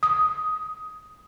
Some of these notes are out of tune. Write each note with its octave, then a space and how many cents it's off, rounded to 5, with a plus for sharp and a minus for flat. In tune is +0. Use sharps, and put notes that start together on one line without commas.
D#6 +15